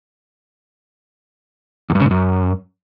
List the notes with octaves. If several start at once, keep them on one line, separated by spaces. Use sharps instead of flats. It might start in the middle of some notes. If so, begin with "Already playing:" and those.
E2
G2
C#3
G#2
F#2